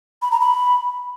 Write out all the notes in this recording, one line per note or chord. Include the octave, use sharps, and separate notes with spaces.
B5
A#5
B5